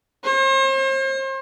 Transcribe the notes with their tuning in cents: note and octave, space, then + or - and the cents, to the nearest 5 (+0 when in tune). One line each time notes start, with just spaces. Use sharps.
C5 +40